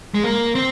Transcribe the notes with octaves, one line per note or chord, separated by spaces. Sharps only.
G#3
A#3
C4